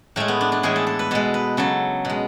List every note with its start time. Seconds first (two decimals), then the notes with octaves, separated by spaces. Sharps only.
0.16 A2 G#3 A3
0.28 B3
0.41 D4
0.52 D4
0.63 A2 E3 G#3 G#4
0.76 A4
0.87 A4
0.99 B4
1.11 B2 G#3 A4
1.34 B4
1.57 C#3 F#3 A4
2.05 B2 G#3